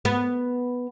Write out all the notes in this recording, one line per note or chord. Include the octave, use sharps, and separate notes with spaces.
B3